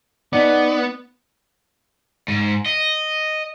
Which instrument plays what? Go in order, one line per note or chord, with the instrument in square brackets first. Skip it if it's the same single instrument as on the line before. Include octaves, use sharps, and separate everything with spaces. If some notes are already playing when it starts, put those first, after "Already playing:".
[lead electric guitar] B3 [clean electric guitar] D#4 D5
[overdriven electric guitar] G#2
D#5